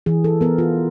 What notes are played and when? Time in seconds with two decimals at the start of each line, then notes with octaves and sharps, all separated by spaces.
0.06 E3 G#4
0.24 A4
0.41 B3 A#4
0.58 F4